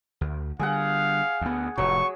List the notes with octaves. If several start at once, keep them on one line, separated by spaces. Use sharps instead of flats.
D2
D3 G3 G#4 F5 F#5
D2 B3
F1 A2 F#3 C#6